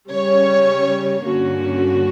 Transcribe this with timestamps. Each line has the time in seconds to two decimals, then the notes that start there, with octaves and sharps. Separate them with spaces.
0.11 C#3 G3 C#4 C#5
1.24 G2 D3 A#3 C#4 F#4